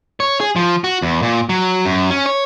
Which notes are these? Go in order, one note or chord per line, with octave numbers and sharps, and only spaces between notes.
C#5
G#4
F3
F#4
E2
A#2
F#3
F#2
C#4
C#5